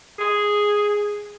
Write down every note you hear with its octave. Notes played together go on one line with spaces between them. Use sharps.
G#4